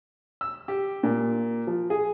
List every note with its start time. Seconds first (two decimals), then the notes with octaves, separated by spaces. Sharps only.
0.41 E6
0.68 G4
1.03 A#2
1.67 F3
1.90 G#4